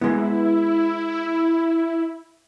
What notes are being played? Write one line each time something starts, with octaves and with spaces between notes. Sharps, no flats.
G#3 B3 E4